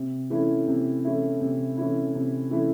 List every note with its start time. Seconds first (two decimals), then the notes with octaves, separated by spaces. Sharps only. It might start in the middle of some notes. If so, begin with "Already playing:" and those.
Already playing: C3
0.30 E3 A3 C#4 E4
0.68 C3
1.05 E3 A3 C#4 E4
1.41 C3
1.77 E3 A3 C#4 E4
2.15 C3
2.51 E3 A3 C#4 E4